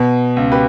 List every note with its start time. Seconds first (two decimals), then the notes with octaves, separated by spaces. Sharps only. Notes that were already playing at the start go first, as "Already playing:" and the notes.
Already playing: B2
0.36 C#2
0.52 G4 B4